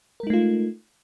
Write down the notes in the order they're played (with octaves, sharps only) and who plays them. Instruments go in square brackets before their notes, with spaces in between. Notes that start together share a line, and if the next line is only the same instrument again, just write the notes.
[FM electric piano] A#4
G#3
D#4
A3
F4